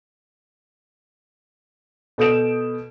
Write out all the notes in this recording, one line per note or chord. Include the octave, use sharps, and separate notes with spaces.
B2 A4 D#6 G6 D7 E7